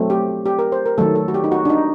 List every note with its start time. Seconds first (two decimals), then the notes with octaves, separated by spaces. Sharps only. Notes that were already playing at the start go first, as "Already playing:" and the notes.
Already playing: F#3 A3 C4
0.10 G4
0.46 G4
0.59 A#4
0.72 C5
0.86 A#4
0.98 D#3 F#3 A3 A4
1.15 A4
1.28 F#4
1.34 G4
1.44 D#4
1.52 F#4
1.65 D4
1.70 D#4